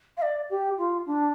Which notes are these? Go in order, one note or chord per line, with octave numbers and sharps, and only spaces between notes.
F5
D5
G4
F4
D4